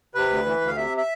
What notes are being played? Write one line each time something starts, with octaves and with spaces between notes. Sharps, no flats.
C3 B4
D2
E3
D2
F5
C3 E5
E5